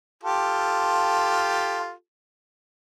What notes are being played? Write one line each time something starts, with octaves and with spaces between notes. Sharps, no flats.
F4 G4 A4